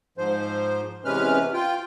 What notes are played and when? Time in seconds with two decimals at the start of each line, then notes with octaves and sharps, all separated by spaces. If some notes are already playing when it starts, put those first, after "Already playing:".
0.18 G#2 F3 C5
1.05 E2 C3 G#3 C#4 B4 F6
1.54 F4 G5